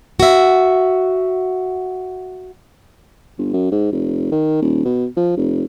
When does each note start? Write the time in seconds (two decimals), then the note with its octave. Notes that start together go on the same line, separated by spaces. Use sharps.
0.20 F#4 E5
3.38 G1
3.53 F#2
3.72 G#2
3.92 F1
4.32 D#3
4.62 D#1
4.85 B2
5.17 F3
5.37 F1